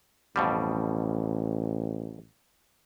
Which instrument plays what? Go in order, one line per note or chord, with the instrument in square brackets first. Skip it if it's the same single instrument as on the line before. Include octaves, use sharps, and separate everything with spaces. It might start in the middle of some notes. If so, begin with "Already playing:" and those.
[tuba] A1 [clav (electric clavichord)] F2 B2 G3